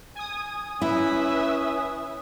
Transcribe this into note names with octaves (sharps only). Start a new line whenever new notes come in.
G#5 D#6
C#4 E4 B4 E5